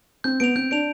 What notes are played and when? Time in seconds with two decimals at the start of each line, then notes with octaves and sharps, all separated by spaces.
0.24 C4 G6
0.40 B3 D7 F7
0.56 C4 G6
0.71 D4 D7 F7